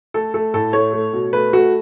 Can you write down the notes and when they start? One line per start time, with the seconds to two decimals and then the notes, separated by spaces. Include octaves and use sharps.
0.14 A3 A4
0.34 A3 A4
0.54 A2 A4
0.73 A3 C#5
0.93 A3
1.13 B2
1.33 A3 B4
1.53 A3 F#4